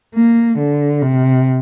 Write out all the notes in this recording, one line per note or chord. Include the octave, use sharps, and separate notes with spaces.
A#3
D3
C3